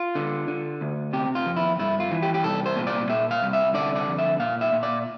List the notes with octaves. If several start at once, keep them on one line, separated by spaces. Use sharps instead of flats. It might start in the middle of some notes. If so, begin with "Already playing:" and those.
Already playing: F4
D3
D3
D2
C3 G4
F4
F2
E4
G2 E4
F4
E3
G4
G4
C2 A4
C5
A#2
D5
A#2 E5
F5
C2
E5
D3 D5
D5
F2
E5
A#2 F5
E5
A#2
D5